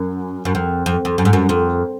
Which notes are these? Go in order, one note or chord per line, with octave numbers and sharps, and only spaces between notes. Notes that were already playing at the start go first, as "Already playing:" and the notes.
Already playing: F#2
F#2
F2
F2
F2
F#2
G#2
F#2
F2